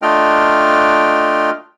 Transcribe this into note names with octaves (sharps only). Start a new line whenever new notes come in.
A3 D4 F4 D#5 G5 F6